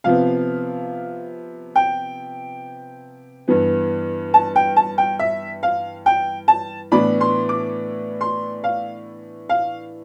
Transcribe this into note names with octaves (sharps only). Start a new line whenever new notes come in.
C3 F3 B3 F5
G5
G2 E3 B3
A5
G5
A5
G5
E5
F5
G5
A5
A2 E3 B3 D4 B5
C6
D6
C6
F5
F5